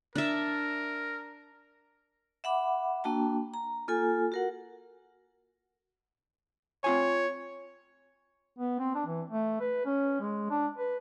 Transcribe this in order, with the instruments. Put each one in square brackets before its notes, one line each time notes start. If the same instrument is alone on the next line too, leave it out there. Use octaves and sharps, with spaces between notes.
[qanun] D4 E5 [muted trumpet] A#4
[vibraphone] E5 F#5 B5 D6
A#3 D4 F#4 G5 A5
A#5
A#3 F4 A4 G#5
F#4 A#4 F#5
[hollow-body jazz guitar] C4 F4 G#5 [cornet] C#5
[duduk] B3
C4
D4
E3
A3
B4
C#4
G#3
D4
B4